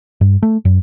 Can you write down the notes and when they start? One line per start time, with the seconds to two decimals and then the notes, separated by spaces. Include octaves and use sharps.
0.21 G2
0.43 A3
0.65 F#2